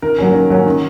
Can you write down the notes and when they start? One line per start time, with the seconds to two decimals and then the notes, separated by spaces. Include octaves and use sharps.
0.02 D#3 A#4
0.18 F#3 A#3 C#4
0.34 D#3
0.50 F#3 A#3 C#4
0.66 D#3